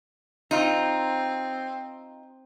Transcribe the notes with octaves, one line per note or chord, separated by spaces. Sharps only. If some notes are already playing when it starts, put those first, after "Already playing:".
C4 D#4 F4